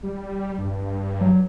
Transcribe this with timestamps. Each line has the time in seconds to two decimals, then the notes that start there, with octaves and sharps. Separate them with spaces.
0.03 G3
0.58 G2
1.21 F#3